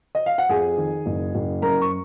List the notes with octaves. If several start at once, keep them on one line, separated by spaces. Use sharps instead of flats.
D#5
F5
F#5
F2 G#4 G#5
D#3
F#1
F#1
F#2 A#4 A#5
C#6